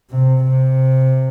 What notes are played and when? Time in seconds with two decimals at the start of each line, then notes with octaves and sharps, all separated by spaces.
0.11 C3
0.44 C3